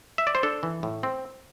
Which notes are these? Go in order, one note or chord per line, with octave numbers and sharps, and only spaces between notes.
E5
D5
C5
D4 A4
E3
A2
C4